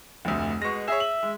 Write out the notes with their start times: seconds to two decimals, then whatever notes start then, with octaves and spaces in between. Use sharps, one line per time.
0.25 F1 D2
0.62 B2 G#3 C#6 A#6
0.88 G#4 C#5 E5
1.00 F#7
1.23 G#3